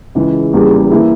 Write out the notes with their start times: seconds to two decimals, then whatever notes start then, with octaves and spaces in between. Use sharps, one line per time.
0.15 C#2 C#3 E3
0.53 E2 C#3 E3 G3 A#3
0.91 E3 A#3 E4